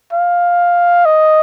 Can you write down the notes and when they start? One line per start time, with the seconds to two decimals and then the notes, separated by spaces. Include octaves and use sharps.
0.13 F5
1.05 D#5